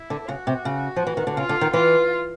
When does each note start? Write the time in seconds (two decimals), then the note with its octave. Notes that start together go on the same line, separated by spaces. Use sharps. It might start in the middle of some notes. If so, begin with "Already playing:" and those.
Already playing: E4
0.10 D3
0.28 C#3 F#4
0.47 C3
0.65 C#3
0.96 F3
1.07 E3
1.17 D#3
1.27 D3
1.37 C#3 F4
1.49 D3
1.61 D#3
1.73 E3 F4